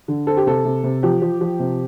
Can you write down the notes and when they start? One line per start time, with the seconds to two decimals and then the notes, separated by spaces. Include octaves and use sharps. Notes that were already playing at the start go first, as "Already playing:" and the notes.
0.08 D3
0.27 C4 A4
0.37 G4
0.47 C3 A4
0.65 C3
0.84 C3
1.03 F3 G4
1.22 F3
1.41 F3
1.60 C3